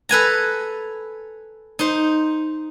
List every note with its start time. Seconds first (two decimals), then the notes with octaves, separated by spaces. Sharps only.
0.09 A4 B4 G#5 A#5
1.79 D#4 C5